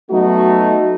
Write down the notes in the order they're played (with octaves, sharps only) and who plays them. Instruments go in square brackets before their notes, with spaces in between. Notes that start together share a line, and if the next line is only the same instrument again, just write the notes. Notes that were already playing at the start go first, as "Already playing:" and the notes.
[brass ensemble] F#3 A3 B3 D#4 F#4